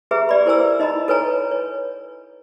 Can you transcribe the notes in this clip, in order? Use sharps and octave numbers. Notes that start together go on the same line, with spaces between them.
G4 G#4 B4 E5 A#5
G4 D5 B5
E4 A#4 C5 G#5 A#5 E6
D#4 D#5 A#5 B5
A4 B4 C#5 G#5 A#5
C#5